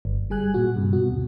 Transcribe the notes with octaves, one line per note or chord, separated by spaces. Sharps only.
G1
G3 G#4 G#5 F#6
A#2 F#4
G2 C3
B2 F#4
D2